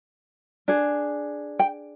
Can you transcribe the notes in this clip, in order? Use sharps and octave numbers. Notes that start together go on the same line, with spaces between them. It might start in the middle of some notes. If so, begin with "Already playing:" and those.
D4 G#4
G5